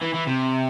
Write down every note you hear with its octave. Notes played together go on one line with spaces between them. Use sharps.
E3
E3
C3